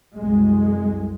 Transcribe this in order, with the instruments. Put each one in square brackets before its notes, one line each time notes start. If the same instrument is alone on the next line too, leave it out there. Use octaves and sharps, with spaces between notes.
[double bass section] C2 F#2 G#3